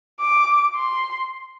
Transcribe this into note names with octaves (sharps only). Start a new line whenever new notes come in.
D6
C6